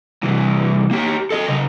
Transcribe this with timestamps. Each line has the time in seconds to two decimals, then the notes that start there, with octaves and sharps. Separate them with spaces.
0.23 C2 E3
0.91 A#3 G4
1.30 A4 D#5
1.48 C#3 A#4